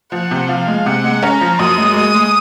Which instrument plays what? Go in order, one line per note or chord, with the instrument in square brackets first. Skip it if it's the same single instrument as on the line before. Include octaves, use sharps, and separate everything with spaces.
[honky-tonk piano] F3 [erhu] F#5
[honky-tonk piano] C3
[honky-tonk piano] F3 [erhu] F5
[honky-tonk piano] G#3
[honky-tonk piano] C3 [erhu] F#5
[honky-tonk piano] G#3
[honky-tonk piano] C#4 [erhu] A#5
[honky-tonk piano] F3
[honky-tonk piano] F#2 [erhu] D#6
[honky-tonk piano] G#3
[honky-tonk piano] G#3 [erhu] D#6
[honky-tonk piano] G#3